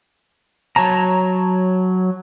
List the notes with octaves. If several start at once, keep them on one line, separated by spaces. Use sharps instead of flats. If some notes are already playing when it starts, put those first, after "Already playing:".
F#3 C#5 A5 A#5